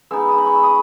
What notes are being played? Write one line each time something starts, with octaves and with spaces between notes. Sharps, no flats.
G#3 B3 D#4 E6
D#6
B5
C#6
E6
D#6